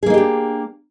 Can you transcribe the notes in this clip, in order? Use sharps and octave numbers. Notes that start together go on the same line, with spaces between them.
A#3 D4 D#4 G4 G#4